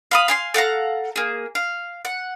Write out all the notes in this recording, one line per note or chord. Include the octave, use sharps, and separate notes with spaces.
F5 B5 D#6
F5 G#5 C6
A4 F5 F#5 A#5
A#3 G#4
F5
F#5